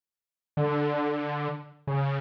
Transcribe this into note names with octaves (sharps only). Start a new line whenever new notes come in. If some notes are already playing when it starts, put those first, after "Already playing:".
D3
C#3